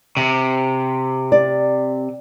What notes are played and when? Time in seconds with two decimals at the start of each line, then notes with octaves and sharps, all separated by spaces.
0.17 C3
1.32 D5